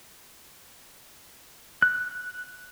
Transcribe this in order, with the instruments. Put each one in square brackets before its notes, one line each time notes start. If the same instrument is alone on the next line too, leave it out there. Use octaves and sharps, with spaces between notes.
[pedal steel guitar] F#6